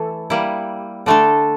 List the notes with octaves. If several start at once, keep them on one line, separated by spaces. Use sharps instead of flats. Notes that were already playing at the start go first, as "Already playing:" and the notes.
Already playing: E3 A3 E4 A4
G3 A#3 E4
D3 A3 D4 A4